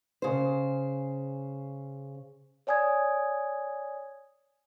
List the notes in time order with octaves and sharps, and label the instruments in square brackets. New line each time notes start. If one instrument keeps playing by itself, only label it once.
[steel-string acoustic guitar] C#3 C5
[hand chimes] C#5 D5 G#5 D#6 G#6